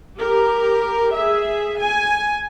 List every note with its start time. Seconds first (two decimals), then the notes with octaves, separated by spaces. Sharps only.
0.18 G4 A#4
1.16 G#4 E5
1.80 G#5